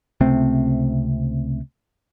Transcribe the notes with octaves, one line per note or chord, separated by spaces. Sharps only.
C#2 C3 A3 C4